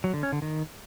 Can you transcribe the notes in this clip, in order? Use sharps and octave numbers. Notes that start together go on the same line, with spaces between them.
F#3
D3
C#4
D3
D#3